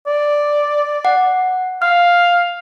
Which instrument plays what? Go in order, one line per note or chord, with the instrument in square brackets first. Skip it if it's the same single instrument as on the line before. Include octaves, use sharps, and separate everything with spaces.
[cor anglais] D5
[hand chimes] F#5
[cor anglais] F5 [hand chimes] F6